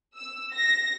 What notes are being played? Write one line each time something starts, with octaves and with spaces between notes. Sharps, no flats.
E6
A#6